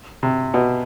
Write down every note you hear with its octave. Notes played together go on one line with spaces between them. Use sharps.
C3
B2